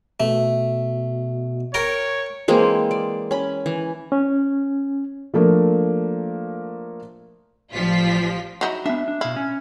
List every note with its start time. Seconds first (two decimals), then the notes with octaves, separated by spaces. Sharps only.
0.20 B2 A3
1.74 A#4 C#5 G5 A#5
2.48 E3 G#3 A#3 C4
2.91 D5
3.31 C#4 B5
3.66 E3
4.12 C#4
5.34 F3 A3 A#3 D4 A#4
7.72 A1 F3 G3 F4 B6
8.61 F#3 D#4 E4 A#5
8.86 B3 D4 E5
9.08 D4
9.21 B2 E4 F5
9.36 C#4